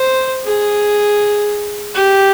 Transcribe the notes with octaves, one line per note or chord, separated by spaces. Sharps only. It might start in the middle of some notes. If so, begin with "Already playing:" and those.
Already playing: C5
G#4
G4